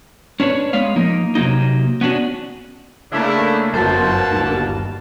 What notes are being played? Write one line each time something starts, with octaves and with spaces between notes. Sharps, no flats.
C#4 D4 B4 C#5
G#3 B3 C#5 F5
F3 A#3 D#4
C3 F#3 A#3 D#4
B3 C#4 D4 F#4
C#3 A3 A#3 D4 E4
G1 F#2 B2 A#3 C5 A5
G1 D#2